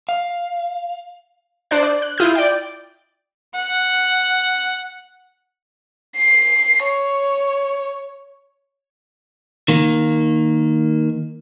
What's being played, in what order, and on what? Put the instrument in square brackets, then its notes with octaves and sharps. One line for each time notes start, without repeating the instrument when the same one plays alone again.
[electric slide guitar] F5
[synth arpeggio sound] D4 C5 D5 F#6
D5
F#6
E4 F4 D#6 F6 G6
D5 G5
[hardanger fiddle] F#5
[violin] C7
C#5
[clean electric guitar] D#3 A#3